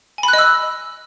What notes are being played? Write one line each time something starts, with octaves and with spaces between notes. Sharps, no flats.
G#5
B5
F#6
D#5
E6